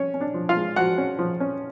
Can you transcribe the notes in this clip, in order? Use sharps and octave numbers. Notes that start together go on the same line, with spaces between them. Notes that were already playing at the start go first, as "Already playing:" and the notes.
Already playing: C#4 C#5
C#4
D4 D5
F3
F4 F5
G#3
F3 F#4 F#5
C#4
F3
C#4